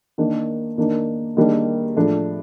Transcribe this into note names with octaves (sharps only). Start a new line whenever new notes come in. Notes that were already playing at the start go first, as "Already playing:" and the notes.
D#3 A#3 D4
D#3 A#3 D4
D#3 G3 A#3 D4
A2 F3 A3 D4